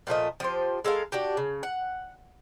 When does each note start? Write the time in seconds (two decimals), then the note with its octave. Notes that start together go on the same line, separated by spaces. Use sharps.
0.07 A#2 F3 A3 D#5
0.40 F3 G4 C5
0.85 G#3 A4 A#4 F5
1.12 D4 F#4 G4
1.37 C#3
1.63 F#5